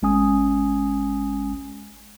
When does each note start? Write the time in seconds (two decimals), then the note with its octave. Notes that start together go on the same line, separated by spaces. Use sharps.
0.02 G#1 G#3 C#4 G#5 D#6